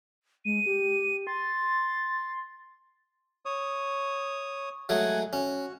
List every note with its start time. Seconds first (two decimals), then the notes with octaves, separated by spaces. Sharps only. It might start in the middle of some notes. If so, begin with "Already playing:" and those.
0.45 G#3 D#7
0.66 G4
1.27 C6 A6
3.45 C#5 D#6
4.89 F#3 G#3 A3 F#5 G#5
5.33 C#4 F#4